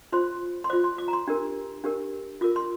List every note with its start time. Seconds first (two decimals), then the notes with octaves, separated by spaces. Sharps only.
0.12 F4 C5 C6
0.64 C6
0.70 F4 C5 D6
0.84 C6
0.98 D6
1.08 A#5
1.13 C6
1.28 D4 G4 A#4
1.84 D4 G4 A#4
2.41 F4 A#4 D6
2.56 C6